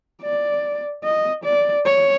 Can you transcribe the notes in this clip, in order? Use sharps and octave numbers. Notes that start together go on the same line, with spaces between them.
D5
D#5
D5
C#5